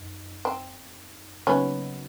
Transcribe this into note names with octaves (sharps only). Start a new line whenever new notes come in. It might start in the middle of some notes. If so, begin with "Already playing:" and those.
Already playing: F#2 D#4
C4
C#3 F#3 A#3 B3 C#4 D#4 F#4